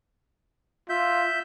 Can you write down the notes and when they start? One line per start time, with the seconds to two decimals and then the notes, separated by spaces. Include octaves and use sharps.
0.89 F4 E5 G6